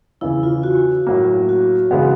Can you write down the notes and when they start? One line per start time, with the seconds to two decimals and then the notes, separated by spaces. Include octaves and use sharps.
0.21 E2 C#3 E3 E4
0.43 F4
0.63 F#4
1.07 A2 F#3 A#3
1.49 F#4
1.91 C#3 E3 G#3 B3